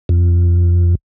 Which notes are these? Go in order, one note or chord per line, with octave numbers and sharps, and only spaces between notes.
F2